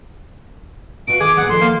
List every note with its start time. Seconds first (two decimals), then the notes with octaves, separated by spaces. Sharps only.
1.08 B2 F#4 F5 D7
1.20 D#3 G#4 D6
1.37 A#2 G#3 F#5
1.49 D#3 F3 A4 C6
1.61 A#3